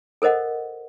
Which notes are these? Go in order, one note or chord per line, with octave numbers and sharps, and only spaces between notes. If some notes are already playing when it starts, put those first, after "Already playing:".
A4 A#4 C5 D#5 F#5